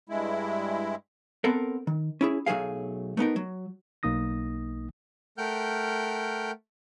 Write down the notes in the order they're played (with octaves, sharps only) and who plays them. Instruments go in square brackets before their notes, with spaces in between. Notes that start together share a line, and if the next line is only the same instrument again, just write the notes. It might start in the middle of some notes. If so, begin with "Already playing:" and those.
[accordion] G2 G#3 E4
[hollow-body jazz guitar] B3 C4 A4 A#4
D#3
C#4 E4 G#4
B1 F#3 A3 G#4 F5
A3 B3 D#4 A#4
F#3
[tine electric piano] B1 A#3 D#4 D#6 A#6
[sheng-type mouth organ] A3 A#4 F#5 G5 F6 G6